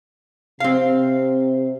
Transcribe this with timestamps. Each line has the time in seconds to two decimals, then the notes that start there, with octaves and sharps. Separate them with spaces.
0.60 C3 C4 F5